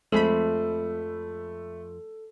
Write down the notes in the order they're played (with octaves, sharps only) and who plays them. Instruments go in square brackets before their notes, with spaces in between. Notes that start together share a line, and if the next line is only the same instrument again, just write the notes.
[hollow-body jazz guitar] F2 F3 C4 [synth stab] G#3 B5 [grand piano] A3 [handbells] A4